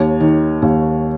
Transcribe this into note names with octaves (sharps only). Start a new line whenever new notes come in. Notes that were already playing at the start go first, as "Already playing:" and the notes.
Already playing: D#2 C#5
D#3
D#2